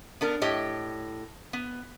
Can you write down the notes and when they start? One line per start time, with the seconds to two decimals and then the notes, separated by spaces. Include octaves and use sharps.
0.21 B3 D4 A#4
0.42 A2 G4 C#5 D#5
1.53 B3